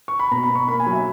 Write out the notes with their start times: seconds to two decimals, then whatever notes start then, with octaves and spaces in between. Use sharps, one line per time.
0.08 C#6
0.19 B5
0.31 B2 A#5
0.43 B5
0.50 B2
0.55 C#6
0.68 A#3 B5
0.80 G#5
0.86 F#3
0.93 E5